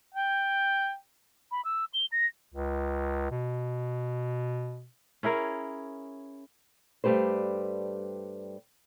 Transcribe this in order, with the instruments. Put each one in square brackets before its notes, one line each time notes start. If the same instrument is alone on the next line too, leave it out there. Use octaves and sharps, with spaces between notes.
[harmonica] G5
[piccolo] B5
E6
G7
A#6
[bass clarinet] C#2
B2
[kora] C#4 E4 G#4 A#4
[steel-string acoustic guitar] G2 G3 A3 G4 B4 C5